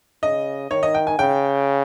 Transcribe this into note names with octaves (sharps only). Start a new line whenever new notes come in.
C#3 D#5
D#3 C#5
D#5
G5
G#5
C#3 G5